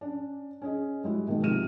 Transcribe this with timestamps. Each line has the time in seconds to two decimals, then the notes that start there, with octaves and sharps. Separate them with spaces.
0.01 C#4 D4
0.61 C#4 G#4 D#5
1.04 G3 G#3 E4 F#4
1.27 B2 D#3 G#3 A#3
1.43 G#2 C3 F3 F6 D#7 E7